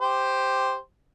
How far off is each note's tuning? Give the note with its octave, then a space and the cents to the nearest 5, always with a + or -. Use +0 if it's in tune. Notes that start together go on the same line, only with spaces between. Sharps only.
G4 +0 C5 +0